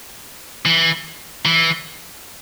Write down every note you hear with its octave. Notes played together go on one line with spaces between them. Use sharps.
E3
E3